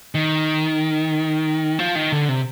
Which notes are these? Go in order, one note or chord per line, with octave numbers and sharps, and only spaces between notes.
D#3
F3
D#3
D3
C3